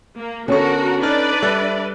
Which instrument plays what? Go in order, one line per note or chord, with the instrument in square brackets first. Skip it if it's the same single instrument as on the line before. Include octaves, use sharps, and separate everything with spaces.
[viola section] A#3
[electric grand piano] D3 B3 C#6 [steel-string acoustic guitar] C#4 A4 [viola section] F#4 A#4
[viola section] D4 B4 D5 [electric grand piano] D#4 F6
[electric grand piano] G3 A4 F#6 [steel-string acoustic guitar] E5